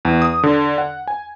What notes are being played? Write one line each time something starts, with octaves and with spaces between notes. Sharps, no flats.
E2
D#6
D3
F#5
G#5